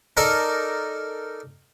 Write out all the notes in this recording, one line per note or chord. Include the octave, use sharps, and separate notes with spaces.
D#4 A4 A#4 D5